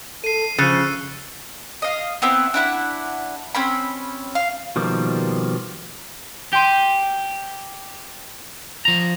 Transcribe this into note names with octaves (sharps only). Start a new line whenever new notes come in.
A4 C7 D#7
C#3 F3 E6 F#6 A6 C#7 D#7
D#5 F5
B3 C4 E4
D4 E4 F#5
C4 C#4 B5
F5
B2 D#3 F3 G3 A#3
G4 G5 C6 D#7
F3 A#5